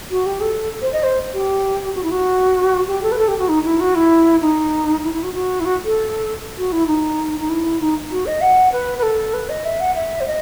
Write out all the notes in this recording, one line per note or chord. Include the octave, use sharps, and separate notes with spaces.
F#4
G4
A4
C5
D#5
C5
G4
F#4
E4
F#4
G4
A4
B4
A4
G4
F#4
D#4
E4
F#4
E4
D#4
E4
E4
F#4
F#4
E4
F#4
A4
F#4
E4
D#4
D#4
E4
D#4
F#4
D#5
F#5
B4
B4
A4
B4
D#5
E5
F#5
E5
C5
D#5